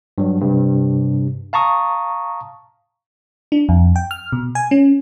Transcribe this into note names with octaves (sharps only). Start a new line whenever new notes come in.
G2 F#3
G2 C3
F5 A5 A#5 C#6 D#6
D4
F2
G5
F6
B2
G#5
C#4